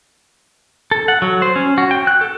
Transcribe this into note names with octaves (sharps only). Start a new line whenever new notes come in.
A4
F#5
F#3
C5
C#4
F#4
G5
F#6
A4